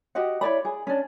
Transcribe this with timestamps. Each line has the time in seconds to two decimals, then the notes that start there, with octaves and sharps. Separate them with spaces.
0.15 F#4 G4 D#5 F#5
0.41 E4 C#5 D5 B5
0.65 G#4
0.87 C#4 D4